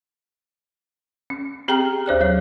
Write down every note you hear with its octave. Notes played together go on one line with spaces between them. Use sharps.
C#4
C4 G4 G#4 G5 A#5 F6
D#2 C5 D5 F#6
F#3 C#5